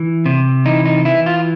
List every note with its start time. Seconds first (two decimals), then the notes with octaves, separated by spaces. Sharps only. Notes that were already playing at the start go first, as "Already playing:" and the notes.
Already playing: E3
0.26 C3
0.66 E3 D#4
0.86 D#4
1.05 E3 E4
1.26 F4